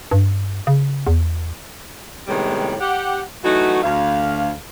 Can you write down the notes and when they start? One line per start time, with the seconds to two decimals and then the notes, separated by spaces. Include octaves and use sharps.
0.11 G2
0.67 C#3
1.07 E2
2.28 A2 C3 D#3 G3 G#3 B3
2.80 G4 F#5
3.44 E3 F#3 A3 D#4 F#4
3.84 D2 F5